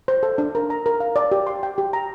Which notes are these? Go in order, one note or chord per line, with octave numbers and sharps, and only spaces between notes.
C5
A4
D4
A#4
A#5
A#4
F5
D5
G4
C6
G5
G4
A#5